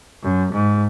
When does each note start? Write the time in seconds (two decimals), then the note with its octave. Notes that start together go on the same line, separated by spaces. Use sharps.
0.23 F#2
0.53 G#2